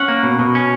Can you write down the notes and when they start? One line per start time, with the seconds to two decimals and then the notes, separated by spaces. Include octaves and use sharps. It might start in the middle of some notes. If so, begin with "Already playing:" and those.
Already playing: C#4 F#5
0.08 A#3
0.23 B2
0.39 B2
0.55 C#4